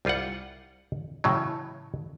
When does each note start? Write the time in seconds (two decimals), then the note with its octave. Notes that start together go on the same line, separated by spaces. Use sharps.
0.05 C2 G3 F4 D5 F#5
1.24 A2 C#3 E3 F#3